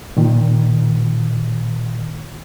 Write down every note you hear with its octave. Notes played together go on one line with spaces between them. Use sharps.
A#2 D#3